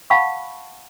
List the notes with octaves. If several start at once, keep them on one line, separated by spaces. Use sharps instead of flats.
F5 F#5 A5 B5 C#6